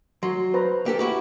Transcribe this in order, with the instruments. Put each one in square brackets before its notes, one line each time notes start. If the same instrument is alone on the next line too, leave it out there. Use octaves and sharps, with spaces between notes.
[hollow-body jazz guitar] F#3 [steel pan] C6
[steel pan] B4 C5 A#5
[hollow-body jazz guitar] A#3 G4 A4
E4 F#4 G4